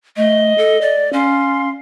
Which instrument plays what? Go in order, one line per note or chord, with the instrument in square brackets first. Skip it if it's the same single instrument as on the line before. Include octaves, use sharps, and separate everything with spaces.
[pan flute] A3 [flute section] D#5
[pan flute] A4
D5
[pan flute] C#4 [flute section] F5 C6